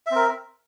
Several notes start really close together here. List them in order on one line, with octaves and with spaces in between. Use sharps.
E5 C4 A#4